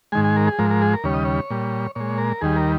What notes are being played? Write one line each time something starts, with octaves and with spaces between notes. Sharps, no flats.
G#2 D#3 G#3 G#5
G#5
A#4
G#4
G#2 F3 G#3 A#4
A#4
G#4
A#4
D#2 C#3 G3 C#5
D#5
C#5
A#2 G3
A#2 G#3 C#5
A#4
D#2 D#3 G3 G#4
A#4